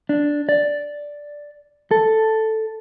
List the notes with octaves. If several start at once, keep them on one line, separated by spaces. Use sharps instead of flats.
D4
D5
A4